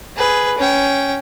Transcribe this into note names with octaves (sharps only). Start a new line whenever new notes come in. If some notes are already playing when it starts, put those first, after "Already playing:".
G#4 B4
C#4 G5